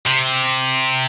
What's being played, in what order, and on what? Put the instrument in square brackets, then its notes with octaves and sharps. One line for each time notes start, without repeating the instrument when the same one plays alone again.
[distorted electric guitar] C3